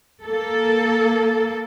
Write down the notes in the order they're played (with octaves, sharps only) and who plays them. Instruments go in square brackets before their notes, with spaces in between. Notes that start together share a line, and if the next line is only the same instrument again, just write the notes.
[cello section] A#3 A4